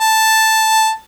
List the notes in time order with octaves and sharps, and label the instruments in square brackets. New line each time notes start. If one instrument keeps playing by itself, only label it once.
[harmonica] A5